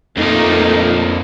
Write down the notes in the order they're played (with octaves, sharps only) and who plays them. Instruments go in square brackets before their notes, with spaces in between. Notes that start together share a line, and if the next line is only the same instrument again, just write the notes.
[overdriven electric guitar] F2 A#3 [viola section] A3 D#4 F4